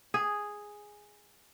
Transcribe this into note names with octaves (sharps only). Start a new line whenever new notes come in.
G#4